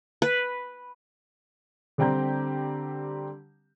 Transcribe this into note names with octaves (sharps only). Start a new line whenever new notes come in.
B4
D3 G3 C4 G4 A#5 G6